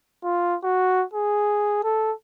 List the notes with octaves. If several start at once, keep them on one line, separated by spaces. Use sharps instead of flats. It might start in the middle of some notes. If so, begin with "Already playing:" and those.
F4
F#4
G#4
A4